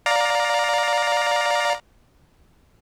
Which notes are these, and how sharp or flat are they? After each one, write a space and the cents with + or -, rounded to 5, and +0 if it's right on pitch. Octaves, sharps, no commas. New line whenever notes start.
D5 +0 F5 +20 A#5 +0